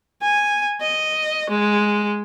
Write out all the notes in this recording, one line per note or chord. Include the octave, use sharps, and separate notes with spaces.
G#5
D#5
G#3